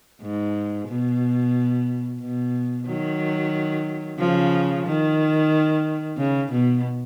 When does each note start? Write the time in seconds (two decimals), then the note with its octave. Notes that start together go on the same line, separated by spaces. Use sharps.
0.22 G#2
0.88 B2
2.20 B2
2.87 D#3 F#3
4.19 C#3 F3
4.86 D#3
6.18 C#3
6.51 B2